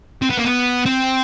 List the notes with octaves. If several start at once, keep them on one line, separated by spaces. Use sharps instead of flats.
C4
B3
A#3
B3
C4